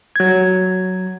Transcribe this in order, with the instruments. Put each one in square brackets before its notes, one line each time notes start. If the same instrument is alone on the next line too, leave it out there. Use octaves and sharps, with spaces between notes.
[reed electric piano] F#3 G#6